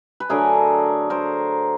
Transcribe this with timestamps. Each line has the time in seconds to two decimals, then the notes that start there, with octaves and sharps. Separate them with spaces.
0.20 B4
0.29 D3 F#3 A3 G#4 A#4
1.10 A#4 C5